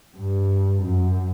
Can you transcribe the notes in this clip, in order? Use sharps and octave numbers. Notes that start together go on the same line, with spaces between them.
G2
F#2